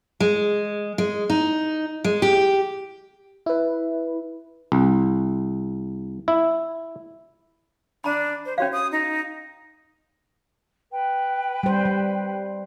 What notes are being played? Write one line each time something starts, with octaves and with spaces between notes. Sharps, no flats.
G#3
G#3
D#4
G#3
G4
E4 B4
C2
E4
D4 A#5 B5
C5
C#4 F#4 C#5 F5
D#6
D#4
B4 G5
G3 C5
G3